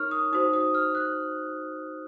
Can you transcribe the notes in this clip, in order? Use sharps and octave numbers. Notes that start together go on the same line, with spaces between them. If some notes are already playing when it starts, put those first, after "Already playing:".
Already playing: D#4 A#4 C#5 C#6 F6
D#6
D#4 F#4 C5 D#6
D#6
F6
F#6